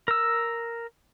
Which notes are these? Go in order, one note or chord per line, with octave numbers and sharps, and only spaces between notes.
A#4 E6